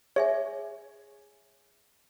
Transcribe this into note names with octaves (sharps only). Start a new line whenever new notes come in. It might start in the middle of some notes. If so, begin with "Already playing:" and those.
G#4 C#5 E5 G#5